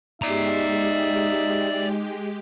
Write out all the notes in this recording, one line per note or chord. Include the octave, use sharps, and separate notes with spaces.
G#3 D#4 G4 D5 E5 A#5